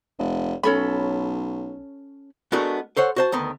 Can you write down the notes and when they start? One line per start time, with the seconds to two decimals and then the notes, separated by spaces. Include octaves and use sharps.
0.19 F1
0.63 B1 C#4 A4 B5
2.52 G#3 A3 B3 D4 F#4 A#4
2.97 A4 C5 C#5 F#5
3.16 F#4 C5 A5
3.32 D2 D#3 B3